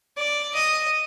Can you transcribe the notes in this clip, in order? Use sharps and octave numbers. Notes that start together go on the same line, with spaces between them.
D5
D#5